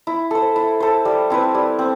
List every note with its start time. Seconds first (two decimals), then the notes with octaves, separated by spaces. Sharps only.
0.07 E4
0.31 A4 C5
0.56 E4
0.80 A4 C5
1.05 G3
1.30 C4 E4 B4
1.55 G3
1.79 C4